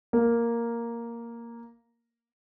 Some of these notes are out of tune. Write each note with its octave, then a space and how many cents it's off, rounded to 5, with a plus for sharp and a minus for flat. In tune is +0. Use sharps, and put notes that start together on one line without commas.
A#3 +0 A#4 +0